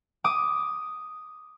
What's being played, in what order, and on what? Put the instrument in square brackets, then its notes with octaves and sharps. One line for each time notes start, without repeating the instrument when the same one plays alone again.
[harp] D6 D#6